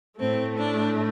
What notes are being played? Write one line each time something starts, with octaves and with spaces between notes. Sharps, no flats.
A2 A3 C4
D4